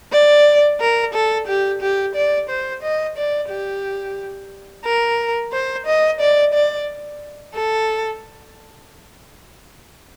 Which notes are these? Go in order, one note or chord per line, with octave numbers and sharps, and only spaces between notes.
D5
A#4
A4
G4
G4
D5
C5
D#5
D5
G4
A#4
C5
D#5
D5
D5
A4